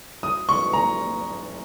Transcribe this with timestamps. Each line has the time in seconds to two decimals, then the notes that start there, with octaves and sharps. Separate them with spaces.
0.23 D#6
0.49 C#6
0.73 A#5